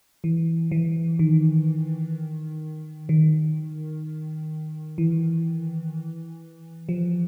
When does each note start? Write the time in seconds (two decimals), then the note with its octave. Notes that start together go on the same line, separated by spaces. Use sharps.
0.24 E3
0.71 E3
1.19 D#3
3.09 D#3
4.98 E3
6.89 F3